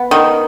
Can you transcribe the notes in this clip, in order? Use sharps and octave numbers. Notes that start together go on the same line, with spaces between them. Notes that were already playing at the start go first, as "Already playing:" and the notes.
Already playing: B3
D#3